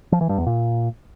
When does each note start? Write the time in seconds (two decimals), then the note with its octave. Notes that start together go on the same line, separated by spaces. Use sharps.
0.12 F3
0.21 E3
0.29 G2
0.38 E2
0.46 A#2